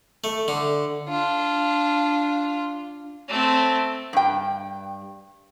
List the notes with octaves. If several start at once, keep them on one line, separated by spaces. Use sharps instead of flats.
A3
D3
D4 F4
A3 C4
G2 G5